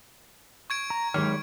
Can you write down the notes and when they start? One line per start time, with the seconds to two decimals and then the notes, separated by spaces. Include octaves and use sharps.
0.70 C#6 G#6 D7
0.90 A#5
1.14 D#2 F#3 G#3 G4 F6